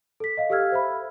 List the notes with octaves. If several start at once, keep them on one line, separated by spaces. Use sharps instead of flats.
A4 B6
D#5 F5
G4 A4 F5 E6 F6 G#6
C5 E5 B5